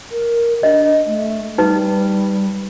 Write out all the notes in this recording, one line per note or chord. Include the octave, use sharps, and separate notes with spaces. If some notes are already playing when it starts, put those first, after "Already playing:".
A#4
D4 D#5
A3
G3 D#4 B4